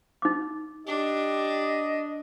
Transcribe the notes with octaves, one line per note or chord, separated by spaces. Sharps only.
D#4 D6
D4 G4 D#5